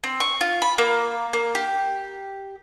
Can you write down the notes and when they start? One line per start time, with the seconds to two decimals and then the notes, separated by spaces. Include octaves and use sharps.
0.04 C4
0.20 C#6
0.41 F4
0.62 B5
0.78 A#3
1.33 A#3
1.55 G4